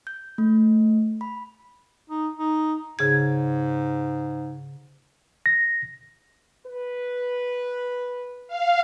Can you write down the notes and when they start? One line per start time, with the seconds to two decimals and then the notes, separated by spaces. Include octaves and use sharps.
0.07 G6
0.38 A3
1.21 B5
2.10 D#4
2.39 D#4
2.99 G#2 C#3 G#4 G#6
5.46 A#6
6.66 B4
8.48 F5